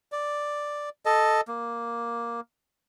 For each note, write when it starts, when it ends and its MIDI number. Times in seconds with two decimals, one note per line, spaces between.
0.12 0.89 74
1.05 1.41 69
1.05 1.41 75
1.48 2.40 58